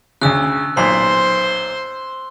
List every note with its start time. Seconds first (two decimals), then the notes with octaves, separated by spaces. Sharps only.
0.22 D2 C#3 E6 F#6
0.77 B1 A#2 C5 C6